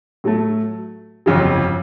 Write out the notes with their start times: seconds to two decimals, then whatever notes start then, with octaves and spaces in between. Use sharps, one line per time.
0.24 A2 F#3 A3
1.26 G1 F2 C#3 F#3